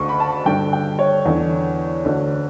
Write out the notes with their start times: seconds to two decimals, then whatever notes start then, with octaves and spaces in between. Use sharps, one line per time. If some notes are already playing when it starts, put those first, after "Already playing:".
Already playing: D2 D3 C#6
0.09 B5
0.20 A5
0.46 G2 D3 G5
0.73 G5
0.99 C#5
1.25 E2 D3
2.05 D2 D3